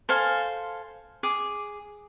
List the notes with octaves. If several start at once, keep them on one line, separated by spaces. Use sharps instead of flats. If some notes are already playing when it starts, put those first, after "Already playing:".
A4 C5 F5 G#5
G#4 D6